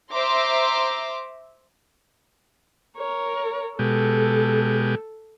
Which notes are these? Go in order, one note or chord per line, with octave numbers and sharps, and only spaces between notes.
C5 E5 A#5 C6 D6
A#4 C#5
B2 G#3 G4 A4